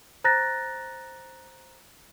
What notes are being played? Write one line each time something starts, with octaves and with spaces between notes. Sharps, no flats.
C5 A#5 F#6 A6 A#6